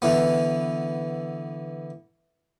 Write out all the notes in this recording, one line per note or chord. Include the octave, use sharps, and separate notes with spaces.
D3 E3 B3